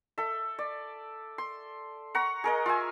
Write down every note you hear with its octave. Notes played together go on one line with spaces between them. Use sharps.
A4 E5
D5
C6
F#5 A#5 C#6
G#4 A#4 D#5
F4 E5 G#5